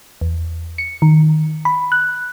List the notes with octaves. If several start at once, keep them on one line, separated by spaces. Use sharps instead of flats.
E2
C#7
D#3
B5
F#6